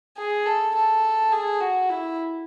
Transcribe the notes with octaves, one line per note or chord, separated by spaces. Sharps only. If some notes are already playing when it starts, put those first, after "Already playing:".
G#4
A4
A4
G#4
F#4
E4